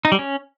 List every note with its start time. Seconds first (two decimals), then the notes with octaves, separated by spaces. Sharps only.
0.05 D#4
0.12 G3
0.19 C#4